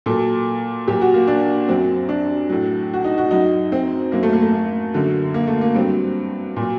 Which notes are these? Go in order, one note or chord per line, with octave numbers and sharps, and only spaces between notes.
A#2 F#3 A4
A#2 F#3 G4
F#4
A#3
D4
F#2 F#3 C4
D4
A2 F#3
F#4
D#4
F#4
F#2 F#3 D#4
C4
F#2 F#3 A#3
A3
A#3
A3
A#3
F#2 D3 F#3
A#3
A3
A#3
G2 F#3 C4
A#2 F#3